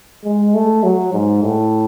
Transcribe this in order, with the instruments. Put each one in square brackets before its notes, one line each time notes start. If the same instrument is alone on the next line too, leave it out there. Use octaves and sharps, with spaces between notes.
[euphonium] G#3
A3
F#3
G#2
A2